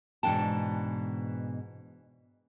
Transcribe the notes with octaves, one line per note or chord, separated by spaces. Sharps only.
G#2 B2 E3 D4 G5 A5